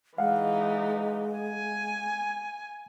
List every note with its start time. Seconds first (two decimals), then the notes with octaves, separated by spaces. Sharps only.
0.18 E3 G#3 D#4 F5 F#5
1.39 G#5